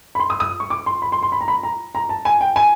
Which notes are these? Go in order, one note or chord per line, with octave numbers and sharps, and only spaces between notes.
B5
C6
D#6
D#6
C#6
D6
C6
B5
C6
C6
B5
A#5
B5
A#5
A#5
A5
G#5
G5
G#5